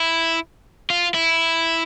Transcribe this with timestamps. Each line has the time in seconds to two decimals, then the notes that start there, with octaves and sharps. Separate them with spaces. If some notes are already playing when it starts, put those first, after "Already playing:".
Already playing: E4
0.90 F4
1.14 E4